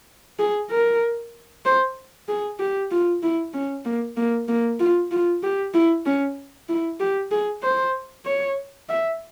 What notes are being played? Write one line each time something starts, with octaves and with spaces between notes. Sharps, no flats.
G#4
A#4
C5
G#4
G4
F4
E4
C#4
A#3
A#3
A#3
F4
F4
G4
E4
C#4
E4
G4
G#4
C5
C#5
E5